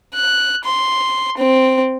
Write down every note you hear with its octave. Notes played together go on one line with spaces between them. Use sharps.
F#6
C6
C4